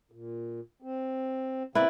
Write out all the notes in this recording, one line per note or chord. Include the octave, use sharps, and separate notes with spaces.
A#2
C4
C#3 A#3 C4 E4 B4 D5